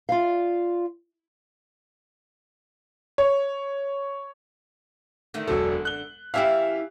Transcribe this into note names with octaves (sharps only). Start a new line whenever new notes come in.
F4 D5 F5
C#5
D3 D#3 A3
E1 F#2 D3 F#3 A4 C5
F#6 G7
E3 C#4 E4 G4 E5 F5